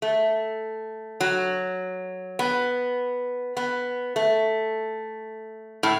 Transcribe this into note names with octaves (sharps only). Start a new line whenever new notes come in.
A3
F#3
B3
B3
A3
A2